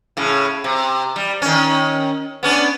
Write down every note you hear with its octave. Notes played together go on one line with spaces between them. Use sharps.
A2 C#3
C3
G3
D#3 C#4
B3 C#4 D4